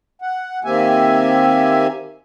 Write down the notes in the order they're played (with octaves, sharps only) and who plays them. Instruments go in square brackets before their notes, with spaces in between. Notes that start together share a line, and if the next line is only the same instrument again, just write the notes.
[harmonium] F#5
D#3 A#3 C4 G4 E5 G#5